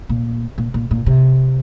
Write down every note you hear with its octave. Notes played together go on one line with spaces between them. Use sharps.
A#2
A#2
A#2
A#2
C3